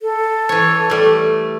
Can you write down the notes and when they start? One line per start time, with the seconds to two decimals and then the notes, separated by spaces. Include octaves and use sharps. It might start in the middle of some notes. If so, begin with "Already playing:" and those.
0.01 A4
0.49 E3 C#5
0.90 G3 A3